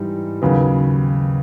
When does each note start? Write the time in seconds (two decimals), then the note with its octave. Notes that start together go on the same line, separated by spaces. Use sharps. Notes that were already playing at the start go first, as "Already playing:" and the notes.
Already playing: G#2 E3 G3 D#4
0.42 D#2 C#3 F#3 B3